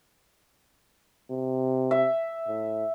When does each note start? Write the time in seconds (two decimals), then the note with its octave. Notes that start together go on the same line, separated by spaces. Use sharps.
1.31 C3
1.91 E5
2.48 A2